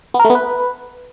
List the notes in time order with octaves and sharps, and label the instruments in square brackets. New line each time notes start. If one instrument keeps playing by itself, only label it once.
[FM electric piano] B3
A#4
A3
B3
B4